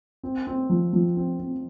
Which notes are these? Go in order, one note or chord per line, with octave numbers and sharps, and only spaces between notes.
C4
C4
F3
F3
C4
C4